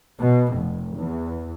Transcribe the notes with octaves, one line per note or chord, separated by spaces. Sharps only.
B2
F1
E2